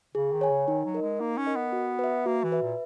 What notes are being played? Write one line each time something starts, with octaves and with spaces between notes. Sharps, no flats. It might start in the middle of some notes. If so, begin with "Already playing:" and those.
C#3 G#4
D#3
C#5 G#5
C#3
D#3 D#4
F#3
A#4 D#5
G#3
A#3 D#4
C#4
A#4 D#5
B3
F#4
B4 E5
A#3 F#4
E3
B4 E5
A#2